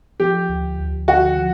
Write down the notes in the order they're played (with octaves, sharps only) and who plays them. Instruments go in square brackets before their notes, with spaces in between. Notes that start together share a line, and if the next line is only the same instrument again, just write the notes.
[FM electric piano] F3 [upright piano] G4
[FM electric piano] D2
D2
[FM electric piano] D3 [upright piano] F#4
[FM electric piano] F3